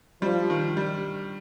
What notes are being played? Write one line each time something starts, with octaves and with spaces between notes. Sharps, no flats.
F3 G3
D#3
G3